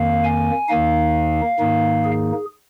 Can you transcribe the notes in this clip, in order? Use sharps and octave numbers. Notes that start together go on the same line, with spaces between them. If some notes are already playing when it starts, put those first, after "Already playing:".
Already playing: F2 D#3 A#3 F5
G#5
D#2 D#3 A#3 D#4 F5
G#2 D#3 A#3 D#4
G#4